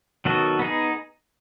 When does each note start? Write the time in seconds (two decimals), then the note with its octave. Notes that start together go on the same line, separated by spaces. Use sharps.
0.25 D#3 F#3 B3 F#4 A4
0.59 B3 D#4 G#4